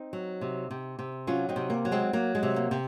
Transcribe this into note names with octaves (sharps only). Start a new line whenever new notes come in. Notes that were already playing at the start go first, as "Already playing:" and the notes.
Already playing: C4 D#4
F#3
C3
C3
C3
F#3 C#4 F4
C4 D#4
C3
A#3
F#3
G#3 C4
F#3 A#3
G#3
C3
A#3
C3